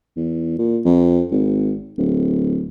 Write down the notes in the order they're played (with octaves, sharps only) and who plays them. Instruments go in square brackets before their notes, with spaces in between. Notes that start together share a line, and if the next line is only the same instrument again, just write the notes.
[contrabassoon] E2
A#2
F2
G#1
D1